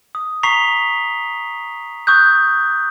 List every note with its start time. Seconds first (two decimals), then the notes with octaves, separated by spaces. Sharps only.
0.15 D#6
0.43 A#5 C#6 B6 C7 F7 G7
2.07 C#6 D#6 F#6 G6